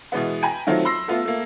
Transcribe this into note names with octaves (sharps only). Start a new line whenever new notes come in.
B2 E3 G#3 B3
G5 G#5 A#5 B5
D#3 F#3 A3 C4 F4
B5 C6 E6 A#6 C7
A3 B3 F4
A3 A#3